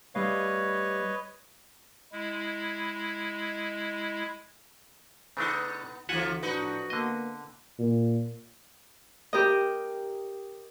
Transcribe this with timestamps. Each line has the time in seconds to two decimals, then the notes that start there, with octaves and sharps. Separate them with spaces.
0.15 G3 A3 B4 C#5 D#5 F5
2.12 G#3 E4
5.37 C#3 A3 B3 D4 D#4
6.09 D2 E3 F4 E5 F#5 G#5
6.42 A2 F3 D4 D#4 F#4 B4
6.90 D3 A#3 B3 D#5
7.79 A#2
9.33 G4 A#4 D#5